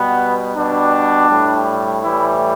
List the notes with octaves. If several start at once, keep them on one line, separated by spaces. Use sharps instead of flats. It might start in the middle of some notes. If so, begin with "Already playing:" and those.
Already playing: B2 G3 B3
B2 G3 D4
A2 G3
A2 E3 G3 E4